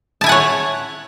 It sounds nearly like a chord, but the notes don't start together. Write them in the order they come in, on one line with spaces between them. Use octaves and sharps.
A5 E4 G#5 F#5 C#5